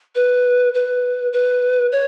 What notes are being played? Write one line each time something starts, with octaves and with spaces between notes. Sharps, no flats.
B4
B4
B4
C#5